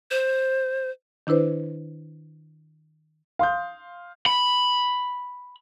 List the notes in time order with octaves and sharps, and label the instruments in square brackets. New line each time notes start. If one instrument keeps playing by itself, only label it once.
[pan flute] C5
[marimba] D#3 D4 E4 B4 C5
[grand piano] F5 C6 D#6 G6
[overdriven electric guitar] B5